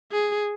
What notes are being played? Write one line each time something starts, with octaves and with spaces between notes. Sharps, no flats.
G#4